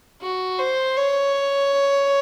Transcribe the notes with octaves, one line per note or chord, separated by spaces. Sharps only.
F#4
C5
C#5